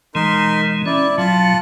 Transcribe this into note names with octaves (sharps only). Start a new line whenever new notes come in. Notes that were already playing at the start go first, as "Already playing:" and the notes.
B2 E3 G#3 D#4 A#4 C6
C#4 E4 D5
B2 F#3 F4 A5